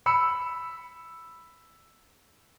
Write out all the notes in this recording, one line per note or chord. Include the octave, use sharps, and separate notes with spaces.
B5 E6 C#7